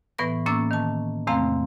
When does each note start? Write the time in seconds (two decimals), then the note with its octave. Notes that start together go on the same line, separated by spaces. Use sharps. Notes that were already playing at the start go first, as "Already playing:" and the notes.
0.18 A2 E3 B3 B4 C#6 A#6
0.46 A2 A#3 C#4 D6 E6 A6
0.71 D#3 A5
1.27 E2 C3 A3 C4 F5 A#5